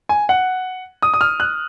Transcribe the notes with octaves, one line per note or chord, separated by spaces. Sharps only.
G#5
F#5
D#6
D#6
F6
F#6